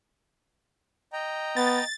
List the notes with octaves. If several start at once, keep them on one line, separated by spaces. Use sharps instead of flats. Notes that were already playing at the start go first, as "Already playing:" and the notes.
D#5 G5 A#5
B3 A6